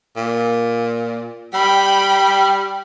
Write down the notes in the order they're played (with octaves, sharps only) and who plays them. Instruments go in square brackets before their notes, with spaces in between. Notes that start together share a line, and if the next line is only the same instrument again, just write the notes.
[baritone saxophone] A#2
[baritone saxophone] G3 [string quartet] G5 B5